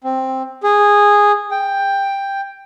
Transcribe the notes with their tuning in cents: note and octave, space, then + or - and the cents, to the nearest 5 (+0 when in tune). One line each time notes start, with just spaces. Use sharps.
C4 +5
G#4 -10
G5 +10